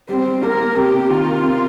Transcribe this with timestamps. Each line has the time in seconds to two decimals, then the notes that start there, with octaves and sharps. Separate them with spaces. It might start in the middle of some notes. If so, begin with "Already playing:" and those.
0.09 G3 C4
0.26 G3
0.43 A#3 A#4
0.60 A#3
0.76 C3 G4
0.94 C3
1.10 D#3 F4
1.27 A#4
1.44 C3